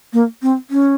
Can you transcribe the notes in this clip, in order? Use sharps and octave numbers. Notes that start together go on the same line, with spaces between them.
A#3
C4
C#4